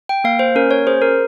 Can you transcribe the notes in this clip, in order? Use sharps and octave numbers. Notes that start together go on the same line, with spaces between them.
G5
A#3 F5
C5
C#4 A#4
C#5
G#4 C5
A#4